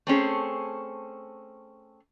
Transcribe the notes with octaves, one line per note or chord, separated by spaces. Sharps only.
A3 C4 C#4 G#4